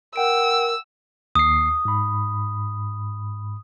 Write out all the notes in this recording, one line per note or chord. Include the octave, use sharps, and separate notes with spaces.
A#4 F#5 G5 E6 D7
D#2 D#6 C7
G#2 B5